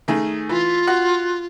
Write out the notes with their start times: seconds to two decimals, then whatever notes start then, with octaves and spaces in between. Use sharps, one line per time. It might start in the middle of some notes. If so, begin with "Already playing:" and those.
0.08 D#3 A3 G#4
0.49 E3 F4
0.87 F#4